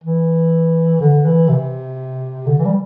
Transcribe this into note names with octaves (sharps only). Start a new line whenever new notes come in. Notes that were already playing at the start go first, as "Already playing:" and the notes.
E3
D3
E3
C3
D3
E3
G3